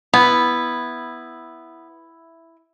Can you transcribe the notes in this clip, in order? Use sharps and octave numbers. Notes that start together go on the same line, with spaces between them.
B3 E4